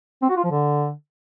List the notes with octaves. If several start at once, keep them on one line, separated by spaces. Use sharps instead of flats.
C4
F#4
F4
F3
D3